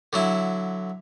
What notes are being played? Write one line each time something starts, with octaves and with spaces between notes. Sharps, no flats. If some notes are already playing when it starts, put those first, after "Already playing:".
D3 F#3 E4